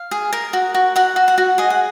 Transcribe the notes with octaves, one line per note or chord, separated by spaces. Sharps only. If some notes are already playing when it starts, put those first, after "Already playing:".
Already playing: F5
G#4
A#4
F#4
F#4
F#4 F#5
F#4
F#5
F#4
G#4 D#5
F#5